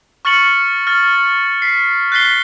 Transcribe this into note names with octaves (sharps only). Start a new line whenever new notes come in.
C#6 F6 A6 C#7 F#7
F6 A6
B6 C7
F#6 A6 B6 C7 G7